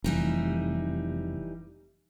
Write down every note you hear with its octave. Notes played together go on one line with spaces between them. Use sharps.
F1 E3 G3 D#4